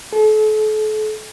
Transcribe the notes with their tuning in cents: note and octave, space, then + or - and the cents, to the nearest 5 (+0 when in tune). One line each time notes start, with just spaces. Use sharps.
A4 -40